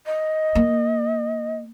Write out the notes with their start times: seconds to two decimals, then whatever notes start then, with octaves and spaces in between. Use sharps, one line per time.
0.06 D#5
0.55 A#3